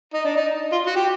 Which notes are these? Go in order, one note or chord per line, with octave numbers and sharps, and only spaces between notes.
D#4
D4
D#4
F4
F#4
G4